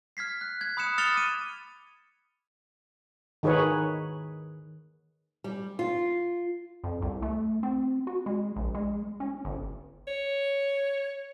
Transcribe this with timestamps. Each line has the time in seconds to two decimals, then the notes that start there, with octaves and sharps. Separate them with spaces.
0.17 F6 G#6 B6 C7
0.41 F#6
0.61 G#6
0.77 B5 D#6 F#6 C#7 E7
0.98 D#6 F6 A6 C#7 F7 G7
1.15 D6 D#7
3.43 D#3 D#4 G#4 B4 C#5
5.44 G3
5.79 F4
6.84 F2
7.02 C2
7.22 A3
7.63 C4
8.07 F#4
8.26 G#3
8.56 A#1
8.75 G#3
9.20 C#4
9.45 G1
10.08 C#5